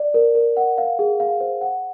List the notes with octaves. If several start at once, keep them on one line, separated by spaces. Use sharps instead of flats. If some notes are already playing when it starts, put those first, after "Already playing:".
Already playing: D5
A#4
A#4
F#5
F5
G#4
F5
C5
F#5